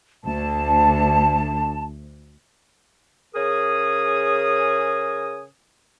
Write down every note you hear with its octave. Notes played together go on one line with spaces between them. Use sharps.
D2 A5
C#3 C#4 G#4 A#4 G#5 D#6